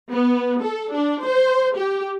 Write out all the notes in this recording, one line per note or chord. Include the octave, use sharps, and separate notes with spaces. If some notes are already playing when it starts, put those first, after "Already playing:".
B3
A4
D4
C5
G4